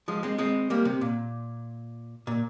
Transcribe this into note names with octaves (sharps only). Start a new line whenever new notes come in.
F3 G#3
G#3 C4
G#3 C4
G3 A#3
C3
A#2
A#2